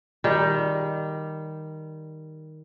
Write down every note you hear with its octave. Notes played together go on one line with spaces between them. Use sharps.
D#3 G3